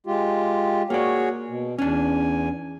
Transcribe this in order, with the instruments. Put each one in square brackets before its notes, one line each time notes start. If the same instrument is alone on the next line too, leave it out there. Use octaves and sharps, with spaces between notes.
[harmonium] G#3 F4 G4
[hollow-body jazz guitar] A#3 D5 [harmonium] F#4 G#4 C#5
[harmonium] B2
[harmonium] E2 G#5 [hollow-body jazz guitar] C#4 D4